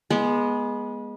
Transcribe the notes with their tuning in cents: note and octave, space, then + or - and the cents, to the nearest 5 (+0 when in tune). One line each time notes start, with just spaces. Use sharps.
G#3 +0 B3 -25